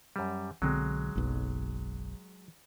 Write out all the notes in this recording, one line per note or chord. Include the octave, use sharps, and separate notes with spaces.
F#2 G3
B1 D3 F#3 G#3 C4
F#1 B1